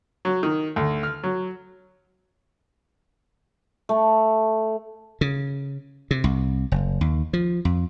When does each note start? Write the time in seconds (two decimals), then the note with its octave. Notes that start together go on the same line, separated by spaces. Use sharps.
0.25 F#3
0.43 D#3
0.76 D2
1.03 F6
1.23 F#3
3.89 A3
5.21 C#3
6.11 C3
6.24 C2
6.72 F#1
7.01 D#2
7.33 F3
7.65 F2